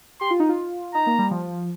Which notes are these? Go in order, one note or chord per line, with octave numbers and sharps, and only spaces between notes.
G4 C6
F4
D#4
F4
D#4 A#5
A#3
G3
F3